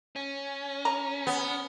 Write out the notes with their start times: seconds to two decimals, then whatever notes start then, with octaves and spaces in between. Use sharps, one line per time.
0.16 C#4
0.85 A#5
1.27 B3